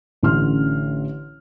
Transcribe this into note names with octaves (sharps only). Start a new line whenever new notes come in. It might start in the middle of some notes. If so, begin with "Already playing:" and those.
A1 D3 C#4 C6 F6